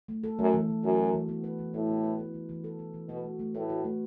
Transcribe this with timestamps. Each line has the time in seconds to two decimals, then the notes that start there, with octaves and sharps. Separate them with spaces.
0.08 A3
0.24 A4
0.39 F#2 A3
0.54 E3
0.69 E3
0.84 F#2 F#4
0.99 A3
1.14 E3
1.29 B3
1.44 B4
1.59 E3
1.74 A2 E4
1.89 B3
2.04 B4
2.19 B3
2.34 E3
2.49 E3
2.64 A4
2.79 B3
2.94 E3
3.09 B2 F#4
3.24 A3
3.39 A3
3.55 A2 B4
3.69 F#4
3.84 A3